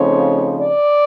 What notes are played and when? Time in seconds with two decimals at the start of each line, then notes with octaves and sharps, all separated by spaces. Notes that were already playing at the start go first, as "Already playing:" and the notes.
Already playing: C#3 F3 A3 C4 D#4 C#5
0.61 D5